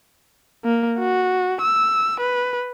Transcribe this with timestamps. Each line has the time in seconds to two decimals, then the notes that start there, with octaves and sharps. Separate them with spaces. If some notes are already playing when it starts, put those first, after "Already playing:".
0.65 A#3
0.99 F#4
1.62 E6
2.20 B4